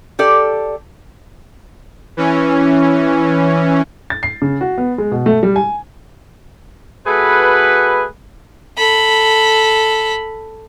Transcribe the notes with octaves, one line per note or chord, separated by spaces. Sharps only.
G4 A4 D5
E3 C#4
A6
C7
C#3
F#4
B3
G#3
B2
A3
G3
G#5
A3 F#4 G#4 A4 B4
A4 B5